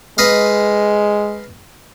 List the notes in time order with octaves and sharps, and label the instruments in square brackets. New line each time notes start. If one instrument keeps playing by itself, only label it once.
[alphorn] G#3 [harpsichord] B4 D#5 F5